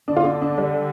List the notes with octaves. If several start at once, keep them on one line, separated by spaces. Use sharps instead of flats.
D3 D4
F4
D4
D4
G3